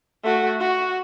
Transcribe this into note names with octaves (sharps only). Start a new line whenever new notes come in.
A3 F#4
F#4